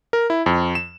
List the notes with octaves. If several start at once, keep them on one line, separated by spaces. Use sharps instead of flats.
A#4
E4
F2
E7